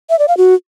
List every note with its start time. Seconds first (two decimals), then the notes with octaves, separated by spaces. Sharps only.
0.10 E5
0.19 D5
0.28 F5
0.37 F#4